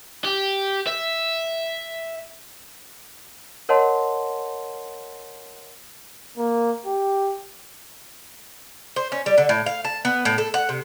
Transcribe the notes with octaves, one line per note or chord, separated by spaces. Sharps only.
G4
E5
A#4 C#5 D#5 F#5 A5 C6
A#3
G4
C5
C#4
G3
D3
A2
F5
A5
B3
A2
A4
F#5
C3